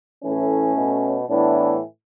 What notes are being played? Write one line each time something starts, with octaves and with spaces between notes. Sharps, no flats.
A2 E3 A3 C#4
B2
A2 E3 B3 D4